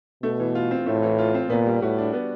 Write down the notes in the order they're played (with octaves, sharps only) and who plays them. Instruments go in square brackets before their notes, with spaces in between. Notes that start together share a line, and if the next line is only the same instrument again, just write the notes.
[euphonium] B2 [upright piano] A3
[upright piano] E3
F4
C4
[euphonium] A2 [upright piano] A3
[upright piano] E3
F4
C4
[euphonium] A#2 [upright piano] B3
[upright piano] G3
[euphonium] A2 [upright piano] F#4
[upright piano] D4
B3